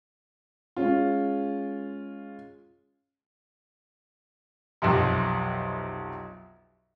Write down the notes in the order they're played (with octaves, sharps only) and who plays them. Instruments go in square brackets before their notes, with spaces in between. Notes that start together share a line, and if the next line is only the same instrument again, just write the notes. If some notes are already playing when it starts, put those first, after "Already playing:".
[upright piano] G#3 C#4 F4
[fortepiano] B1 F2 C3